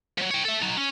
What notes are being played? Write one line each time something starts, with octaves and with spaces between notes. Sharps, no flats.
F3 F#3
C#5 G5
A4 E5
F#3 D#4
C#4